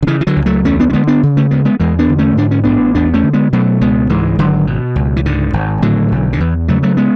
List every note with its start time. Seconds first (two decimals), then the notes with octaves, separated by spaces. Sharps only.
0.03 D3
0.07 C#3 E3
0.21 E3
0.27 D3 F#3
0.36 C#2
0.46 F#3 A3
0.65 E2 A3 C#4
0.80 B3 D4
0.90 C#4
0.93 D3 G#3 B3
1.07 B3 D4
1.23 C#3
1.37 A3 C#4
1.51 D2 G#3 B3
1.65 G#3 B3
1.80 E2 E3 G#3
1.99 B3 D4
2.09 D3
2.18 A3 C#4
2.37 G#2 D4
2.51 C#4
2.64 A1 B3 D4
2.95 E2 B3 D4
3.14 A3 C#4
3.23 D3
3.33 G#3 B3
3.53 B2 F#3 A3
3.81 C#2 G#3 B3
4.09 G#2 E3 G#3
4.39 G#1 D3 F#3
4.67 B2
4.96 C#2
5.16 E3
5.26 G#2 D3
5.53 G#1
5.82 A2 D3 F#3
6.12 B1
6.33 D3
6.40 E2 E3
6.68 C#3 F#3 A3
6.83 F#3 A3
6.97 G#3 B3